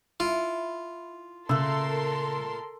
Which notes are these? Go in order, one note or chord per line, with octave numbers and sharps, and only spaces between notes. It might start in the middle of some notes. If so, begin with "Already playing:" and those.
E4 F4
A#2 C#3 A3 A4 A#4 C6 E6